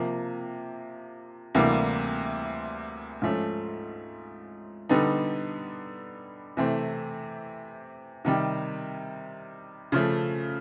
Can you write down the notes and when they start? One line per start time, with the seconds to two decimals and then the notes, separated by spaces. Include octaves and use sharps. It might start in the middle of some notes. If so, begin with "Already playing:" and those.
Already playing: C3 F3 A#3
1.55 D2 C3 E3 G3 A#3
3.22 G#2 F3 A3 C#4
4.89 D3 G3 B3 D#4
6.57 C3 E3 A3 C4
8.25 C3 D#3 G3
9.92 C#3 F3 A3